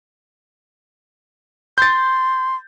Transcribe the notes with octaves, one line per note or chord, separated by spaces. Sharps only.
C6 G6 A6